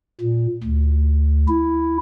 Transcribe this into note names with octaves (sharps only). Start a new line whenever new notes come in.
A#2
D2
E4